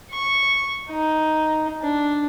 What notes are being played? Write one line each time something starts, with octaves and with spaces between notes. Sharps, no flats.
C#6
D#4
D4